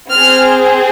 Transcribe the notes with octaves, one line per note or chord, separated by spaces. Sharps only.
C4 G#4 F6